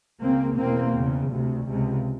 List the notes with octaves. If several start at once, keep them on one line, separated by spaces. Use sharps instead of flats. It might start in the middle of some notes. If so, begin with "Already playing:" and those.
C#2 C#3 A#3 C4
E2 B2 A#3 C4
E2
C#3
D2 C3
C#2 C3